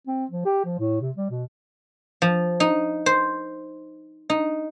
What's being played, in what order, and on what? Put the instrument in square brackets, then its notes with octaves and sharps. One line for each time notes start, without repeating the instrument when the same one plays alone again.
[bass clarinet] C4
F3
G4
F3
A2
C3
G3
B2
[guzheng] F3
D#4
C5
D#4